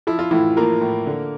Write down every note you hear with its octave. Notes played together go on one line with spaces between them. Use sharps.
F3 E4
F4
A2 E3 E4
F3 A#3 A#4
A2
D3